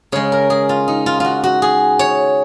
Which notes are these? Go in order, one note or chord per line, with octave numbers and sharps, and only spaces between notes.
C#3 G#3 C#5
A#4
G#4
F4
D#4
F4
F4 F#4
F#4
G#4
C#5